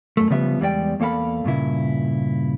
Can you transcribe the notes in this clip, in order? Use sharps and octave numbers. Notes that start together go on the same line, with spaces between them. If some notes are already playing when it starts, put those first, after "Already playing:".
F#2 A3
C#3 F3 G3 B3 E5
E2 G3 G#3 D5 G5
E2 A#3 A4 F5 B5
G2 A#2 C#3 E4